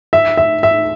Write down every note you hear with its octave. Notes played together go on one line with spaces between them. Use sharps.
E5
E5
E5